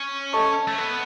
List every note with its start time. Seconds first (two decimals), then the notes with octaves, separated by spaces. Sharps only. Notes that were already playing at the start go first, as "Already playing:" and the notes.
Already playing: C#4
0.33 A4 D#5 A5 C#6
0.68 A3
0.78 B3